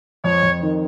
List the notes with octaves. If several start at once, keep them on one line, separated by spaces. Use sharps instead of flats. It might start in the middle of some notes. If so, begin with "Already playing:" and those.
F2 C#5
F2
D#3